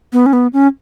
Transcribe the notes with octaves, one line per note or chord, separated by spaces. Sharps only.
B3
C#4
B3
C#4